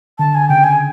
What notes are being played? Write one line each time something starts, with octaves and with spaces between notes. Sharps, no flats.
D3 A5
G#5
C#3 G5
G#5